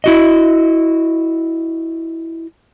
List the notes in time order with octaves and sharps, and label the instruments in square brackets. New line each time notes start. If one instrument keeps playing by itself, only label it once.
[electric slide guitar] E4 F#4 D#5